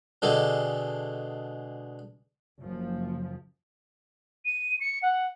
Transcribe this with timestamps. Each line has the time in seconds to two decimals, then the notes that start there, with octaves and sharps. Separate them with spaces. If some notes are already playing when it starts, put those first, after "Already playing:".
0.22 B2 D3 G#3 G4 A4
2.60 F#1 F3
4.45 D#7
4.80 C#7
5.03 F#5